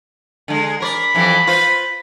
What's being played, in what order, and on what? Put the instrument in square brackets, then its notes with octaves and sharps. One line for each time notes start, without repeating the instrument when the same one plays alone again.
[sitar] D3 G#3
[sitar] A#4 C#5 D5 [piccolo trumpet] B5
[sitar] F2 E3 G3
F4 B4 C5